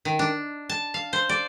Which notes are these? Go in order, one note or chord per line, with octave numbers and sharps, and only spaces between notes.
D#3
D4
A5
F5
C5
D5